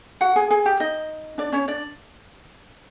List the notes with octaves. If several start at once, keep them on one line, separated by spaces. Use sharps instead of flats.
F#4 F#5
G#4 G#5
G#4 G#5
G4 G5
D#4 D#5
D4 D5
C#4 C#5
D4 D5